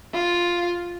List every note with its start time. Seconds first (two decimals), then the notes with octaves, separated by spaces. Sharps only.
0.14 F4